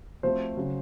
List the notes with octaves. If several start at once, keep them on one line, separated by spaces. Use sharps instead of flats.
F3 A3 C4 F#4 A4 C5
C#3 F#3